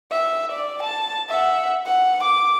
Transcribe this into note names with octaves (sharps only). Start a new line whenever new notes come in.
E5
D5
A5
E5 F#5
F#5
D6